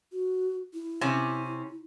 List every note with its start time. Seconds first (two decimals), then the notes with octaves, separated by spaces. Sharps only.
0.12 F#4
0.74 E4
1.01 C3 C#4